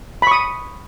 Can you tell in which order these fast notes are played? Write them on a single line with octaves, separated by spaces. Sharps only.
B5 C#6 D#6